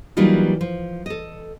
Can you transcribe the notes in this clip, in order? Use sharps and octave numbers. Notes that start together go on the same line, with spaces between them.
E3 F#3 G3 A#3 D#4 F4
F3
A4 D#5